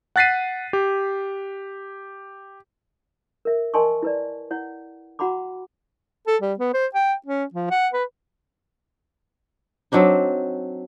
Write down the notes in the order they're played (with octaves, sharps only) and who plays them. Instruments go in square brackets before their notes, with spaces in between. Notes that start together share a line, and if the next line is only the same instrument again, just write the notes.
[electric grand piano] F#5 F#6 A6 B6 C7 D#7
G4
[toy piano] A#4 E5
A#4 D#5 G#5 A5 C6 C#6
E4 B4 D5
E4 C#5 F#5
F#4 F#5 A#5 B5 D6
[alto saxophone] A4
G3
B3
C5
G5
C#4
F3
F#5
B4
[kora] F#3 C4 D4 D#4